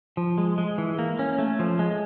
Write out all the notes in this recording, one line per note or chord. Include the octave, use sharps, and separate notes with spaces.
F3
G#3
G#3
E3
A#3
C#4
A3
F3
G#3